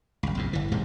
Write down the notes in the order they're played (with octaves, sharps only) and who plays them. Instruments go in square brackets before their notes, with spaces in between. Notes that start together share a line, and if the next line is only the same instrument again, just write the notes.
[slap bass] G#1 C#2
B1 F2 G#2
G1 E3
D#1 G#2 C3 G#3